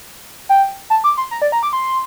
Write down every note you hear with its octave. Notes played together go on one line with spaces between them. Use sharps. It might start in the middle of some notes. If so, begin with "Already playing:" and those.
G5
A5
D6
C6
A#5
D5
A#5
D6
C6